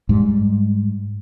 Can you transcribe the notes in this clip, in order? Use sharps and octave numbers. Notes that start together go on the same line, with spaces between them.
G#2 G3